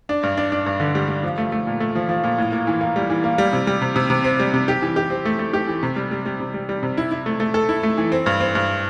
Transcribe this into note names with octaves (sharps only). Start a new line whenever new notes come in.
D4
G2
D4
D4
G2
D3
G3
G3
F3
A3
A3
A#2
A3
F3
F3
A#2
A2
A#3
E3
A#3
G3
E3
A#3
G3
C3
G3
C3
C3
C3
C4
G3
C3
G4
E3
G4
C4
A3
A3
G4
E3
C3
G3
G3
G3
C3
G3
G3
C3
E4
E4
A3
A3
A4
E4
A3
E3
C4
G2
C4
G2